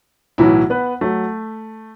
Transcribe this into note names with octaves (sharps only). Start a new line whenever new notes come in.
B1 A2 E3 F#3 E4
B3 B4
F#3 A3